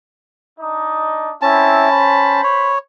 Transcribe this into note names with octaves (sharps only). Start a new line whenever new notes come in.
D4 D#4 D#5
C4 C#4 E4 A5
C5 B5
C#5